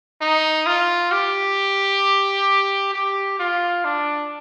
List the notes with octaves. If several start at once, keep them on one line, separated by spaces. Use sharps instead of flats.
D#4
F4
G4
G4
F4
D4